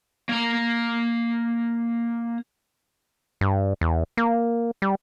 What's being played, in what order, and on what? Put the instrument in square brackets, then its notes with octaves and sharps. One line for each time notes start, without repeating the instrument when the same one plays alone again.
[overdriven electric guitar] A#3 A#5
[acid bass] G2
E2
A#3
G3